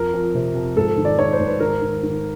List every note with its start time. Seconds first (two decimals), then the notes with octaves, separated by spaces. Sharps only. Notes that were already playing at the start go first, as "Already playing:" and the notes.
Already playing: F2 A#4
0.14 F2
0.34 C3
0.55 F2
0.76 G#2 A4
0.98 D#3
1.05 D5
1.19 D#3 C#5
1.33 C5
1.39 G#2
1.47 B4
1.60 D#3 A#4
1.82 D#3
2.03 D#3